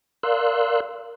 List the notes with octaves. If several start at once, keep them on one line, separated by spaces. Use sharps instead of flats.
A#4 D5 F5 C6 E6 F#6